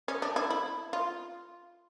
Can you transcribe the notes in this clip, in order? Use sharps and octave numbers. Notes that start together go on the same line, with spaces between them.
C#4
D4
E4
E4
F4